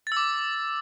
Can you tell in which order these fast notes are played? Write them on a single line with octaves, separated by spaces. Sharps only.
A6 E6 D6